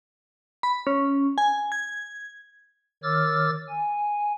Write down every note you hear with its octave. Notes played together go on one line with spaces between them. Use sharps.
B5
C#4
G#5
G#6
D#3 C#5 D6 E6 F6 A6
G#5